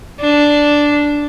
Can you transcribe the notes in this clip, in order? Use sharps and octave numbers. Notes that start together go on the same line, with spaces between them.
D4